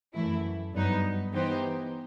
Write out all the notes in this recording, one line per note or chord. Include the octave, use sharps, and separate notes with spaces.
F#2 E3 A3 E4
G2 F#3 B3 D#4
E3 B3 D#4 G4 C5